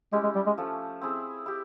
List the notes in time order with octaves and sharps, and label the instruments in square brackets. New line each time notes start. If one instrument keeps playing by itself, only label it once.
[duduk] G#3 [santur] C#4 E4 G4
[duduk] G#3
G3
G#3
[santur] F3 A3 C#4
C4 E4 G#4
E4 G4